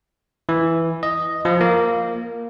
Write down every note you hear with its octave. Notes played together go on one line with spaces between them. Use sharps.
E3
D#5
F3
A#3